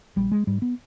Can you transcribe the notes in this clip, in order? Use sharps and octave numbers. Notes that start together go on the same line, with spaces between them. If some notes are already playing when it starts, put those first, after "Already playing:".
A#1 G3
G#3
G#2 G3
B3